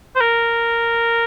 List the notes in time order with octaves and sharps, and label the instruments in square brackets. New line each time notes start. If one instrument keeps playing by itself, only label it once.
[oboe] C5
A#4